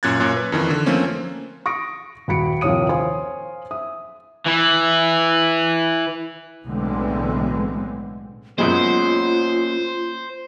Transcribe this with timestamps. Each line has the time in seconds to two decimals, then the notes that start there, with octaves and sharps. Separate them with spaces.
0.03 F#2 A#2 C#4 F#6 G#6 A6
0.20 F#2 A#2 C#5
0.36 B4
0.52 F2 D#3 E3
0.70 D3
0.86 F3 A3 A#3 C4 C#4
1.66 C#6 D#6 A#6 D7
2.28 D#1 F#4 B5 C#7 D7
2.61 A#1 D#2 C3 C#5 D#6 D#7
2.89 C5 C#5 F5 G#5 C6 D#6
3.71 E5 D#6
4.46 E3 E4
6.66 B1 A2 D3 E3 G#3 C4
8.58 F#2 B2 G#3 A#3 C#4 F4 C5 F#5